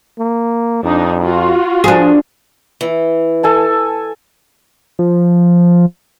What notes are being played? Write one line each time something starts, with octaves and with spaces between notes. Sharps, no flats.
A#3
F2 D4 D#4
F4 F#4
F3 D4 G#4
E3
A4 G#5 A5
F3